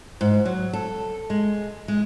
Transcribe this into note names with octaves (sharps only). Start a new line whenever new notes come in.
G#2
F#3
A4
G#3
G#3